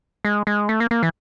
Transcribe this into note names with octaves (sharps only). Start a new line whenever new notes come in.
G#3
G#3
A3
A#3
A#3
E3